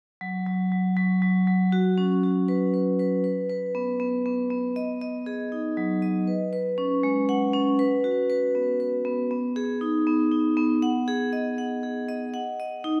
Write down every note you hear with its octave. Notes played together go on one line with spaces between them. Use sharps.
F#3
F#3
F#3
F#3
F#3
F#3
F#4
C#4
F#4
B4
B4
B4
B4
B4
B3
B3
B3
B3
D#5
D#5
G#4
D#4
F#3
D#5
B4
B4
C#4
G#3
F#5
C#4
B4
F#4
B4
B3
B4
B3
B3
G#4
D#4
B3
D#4
B3
F#5
G#4
D#5
F#5
G#4
D#5
F#5
D#5
D#4